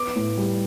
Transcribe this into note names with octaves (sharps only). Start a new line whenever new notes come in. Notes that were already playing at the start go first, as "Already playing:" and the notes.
Already playing: B3 D6
A2
G3